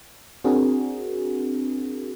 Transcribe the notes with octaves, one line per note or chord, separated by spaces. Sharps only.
C4 D4 F#4 G#4 A#4